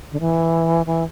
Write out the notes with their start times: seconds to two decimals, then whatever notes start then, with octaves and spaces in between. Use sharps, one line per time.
0.12 D3
0.20 E3
0.86 E3